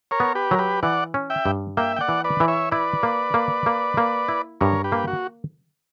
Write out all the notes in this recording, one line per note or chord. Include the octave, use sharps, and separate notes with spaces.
A#4 C#5
B3
G4 B4
F#3 A#4
G4 B4
E3 D5 F#5
C#4
E5 G5
G2
A#3 E5 G5
G5
D5 F#5
E3
B4 D5
E3
C#5 E5
E4 B4 D5
A#3
A#3
A#3
A#3
E4
G2 A#4 C#5
G4 B4
A#3
F#4